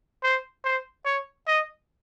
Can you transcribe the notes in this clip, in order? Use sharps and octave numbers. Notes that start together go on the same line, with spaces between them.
C5
C5
C#5
D#5